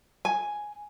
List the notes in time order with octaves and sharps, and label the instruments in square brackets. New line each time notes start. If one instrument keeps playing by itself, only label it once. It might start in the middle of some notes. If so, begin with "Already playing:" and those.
[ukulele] G#5